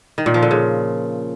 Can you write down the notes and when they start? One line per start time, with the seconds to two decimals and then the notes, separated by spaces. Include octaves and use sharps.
0.18 D#3
0.26 A#2
0.34 F3
0.42 D3
0.51 C#3